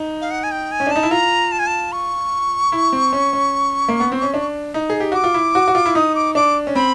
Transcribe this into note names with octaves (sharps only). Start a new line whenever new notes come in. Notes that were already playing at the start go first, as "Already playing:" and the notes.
Already playing: D#4
F5
F#5
G#5
G5
G#5
C#4
D4
D#4 A5
E4
F4 A#5
A5
G#5
A5
C#6
E4
C4
C#4
C#4
A#3
B3
C4
C#4
D4
D#4
G#4
G4
F#4 D6
F4
E4
F#4
F#4
F4
E4
D#4 D#6
D6
D4 D6
C#4
C4 B5